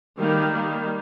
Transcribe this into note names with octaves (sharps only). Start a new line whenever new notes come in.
D#3 G3 A#3
D#3 G3 A#3